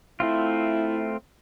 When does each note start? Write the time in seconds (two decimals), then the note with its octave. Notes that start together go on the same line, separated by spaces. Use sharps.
0.20 A3 C4 E4 F4